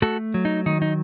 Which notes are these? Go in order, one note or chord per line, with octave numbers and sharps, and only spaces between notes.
A3 F#4 A4
F#3
D#4
D#3 D#4
D#4